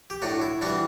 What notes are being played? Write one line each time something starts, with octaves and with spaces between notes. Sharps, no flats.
G4
A2 D4 F#4
E4
E3 G3 D4 F#4